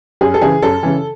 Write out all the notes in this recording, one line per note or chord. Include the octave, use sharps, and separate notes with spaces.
F#2 G#4
A4
C#3 E3 G#4
F#2 A4
C#3 E3